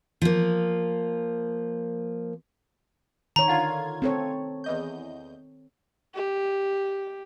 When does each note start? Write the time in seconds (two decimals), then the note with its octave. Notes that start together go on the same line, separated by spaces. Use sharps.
0.22 F3 A#3
3.36 D#3 C#5 A#5
3.48 D3 F4 G#6
4.02 C4 A4 C#5
4.64 E2 D#5 G6
6.15 G4